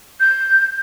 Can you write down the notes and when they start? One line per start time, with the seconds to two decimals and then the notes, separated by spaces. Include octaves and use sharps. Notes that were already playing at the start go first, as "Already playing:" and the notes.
0.20 G6